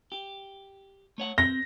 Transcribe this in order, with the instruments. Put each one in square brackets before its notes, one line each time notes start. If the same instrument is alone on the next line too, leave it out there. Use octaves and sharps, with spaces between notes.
[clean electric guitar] G4
A3 C#5 F#5
[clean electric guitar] C4 [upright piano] A#6